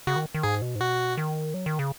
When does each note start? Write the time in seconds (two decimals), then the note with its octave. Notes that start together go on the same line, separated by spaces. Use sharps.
0.07 C#3 F#4
0.16 D#3
0.35 D#3
0.43 G#2 G#4
0.62 B2
0.75 G#2
0.80 B2 F#4
1.18 D#3
1.54 F#3
1.66 D#3
1.79 C#3